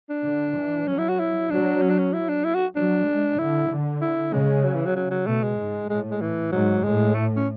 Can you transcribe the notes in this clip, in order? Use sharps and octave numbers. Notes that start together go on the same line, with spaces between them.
D4
D3
E3
F#3 C#4
E4
F#4
E4
F#3 D4
C#4
D4
C#4
E4
D4
E4
F#4
F#3 D4
G#3
D3 E4
D3
E4
C#3 G#3
F#3
E3
F#3
F#3
F#3
B2 A3
G#3
G#2
A2 G#3
G#3
E3
G#2 F#3
A2 G#3
A3
C#4